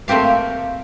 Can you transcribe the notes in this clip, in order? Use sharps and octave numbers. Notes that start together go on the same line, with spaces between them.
A3 A#3 C4 G4 F5